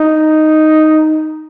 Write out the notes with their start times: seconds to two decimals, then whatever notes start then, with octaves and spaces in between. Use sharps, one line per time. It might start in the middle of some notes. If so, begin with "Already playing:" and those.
Already playing: D#4